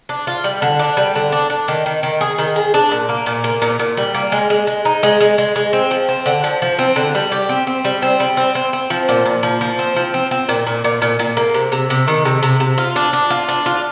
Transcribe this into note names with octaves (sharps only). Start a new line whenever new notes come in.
D4
F4
G3
D3
D4
G3
D3
D4
D4
D#3
D#3
D#3
G#4
D#3
G#4
D4
A#2
A#3
A#2
A#3
A#2
A#2
G3
A#3
G#3
G#3
G#3
D#4
G#3
G#3
G#3
G#3
C4
F3
C4
D3
F3
F3
C4
D3
G3
G4
C4
C4
G3
C4
G3
C4
C4
C4
F3
A#2
A#2
F3
F3
C4
F3
C4
C4
A#2
A#2
A#2
A#2
A#2
A#3
C3
C3
C3
D#3
C3
C3
C3
F4
D4
D4
F4
D4
F4